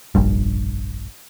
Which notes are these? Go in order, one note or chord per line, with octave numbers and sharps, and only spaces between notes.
F1 A#1 G2